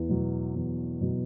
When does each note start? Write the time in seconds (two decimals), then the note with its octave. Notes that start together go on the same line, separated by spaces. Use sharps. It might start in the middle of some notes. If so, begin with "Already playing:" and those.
Already playing: E2
0.09 B2 F#3
0.55 E2
1.01 B2 F#3